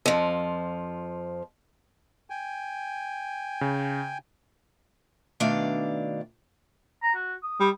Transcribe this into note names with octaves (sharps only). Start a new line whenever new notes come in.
F2 F3
G5 G#5
C#3
B2 D#3 A3 D4 D5 F5
A#5
F#4
D#6
G3